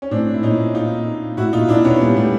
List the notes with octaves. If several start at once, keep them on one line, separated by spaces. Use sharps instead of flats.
C#4
A2 C4 D4
A2 E4
A#2 C#4 D#4
D#4 F4
A2 E4 F#4
A#2 D#4 F4
A#2 D4 E4
B2 B3 C#4
A#2 G3
A2 G3 A3